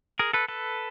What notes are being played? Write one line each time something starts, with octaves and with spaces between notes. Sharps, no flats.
G#4 A#4
A4 B4
A4 B4